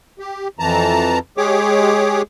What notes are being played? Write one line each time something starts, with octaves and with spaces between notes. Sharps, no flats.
G4
F2 E3 A5 A#5
G#3 G4 G#4 C#5 D6